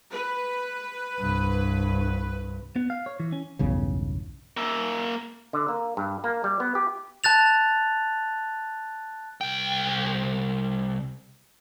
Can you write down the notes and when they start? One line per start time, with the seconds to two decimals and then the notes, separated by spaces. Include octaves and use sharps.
0.11 B4
1.19 C2 G2
2.76 B3
2.90 F5
3.06 C#5
3.20 E3
3.32 C#4
3.59 B1 E2 G2 C#3
4.57 A#3 E5
5.53 D3
5.68 A#3
5.97 G2
6.24 A#3
6.44 G3
6.60 B3
6.75 G4
7.24 A5 F#6 A6 F7
9.41 C2 G5